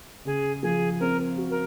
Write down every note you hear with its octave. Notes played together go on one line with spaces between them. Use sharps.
C#3 G#4
F3 G#4
C4 A#4
F#4
A#4